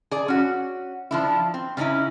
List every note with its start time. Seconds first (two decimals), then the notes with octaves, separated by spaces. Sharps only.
0.11 G#4 D5
0.28 C#4 F#4
1.11 F3 D4 E4
1.54 C4
1.77 C#3 G3 C#4 D#4 E4